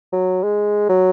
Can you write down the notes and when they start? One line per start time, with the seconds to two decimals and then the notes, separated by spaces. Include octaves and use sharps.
0.12 F#3
0.43 G#3
0.89 F#3